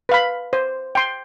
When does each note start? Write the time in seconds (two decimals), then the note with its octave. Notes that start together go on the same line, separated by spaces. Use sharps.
0.09 B4 F5 B5
0.53 C5
0.95 G5 C6